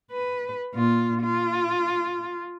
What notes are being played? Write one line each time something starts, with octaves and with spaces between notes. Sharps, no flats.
B4
A#2 F4
F4